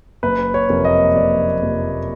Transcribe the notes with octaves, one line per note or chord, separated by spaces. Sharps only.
F#1 B4
C#5
F2 C3 F3 A#3
D#5
F#1 D5
F2 C3 F3 A#3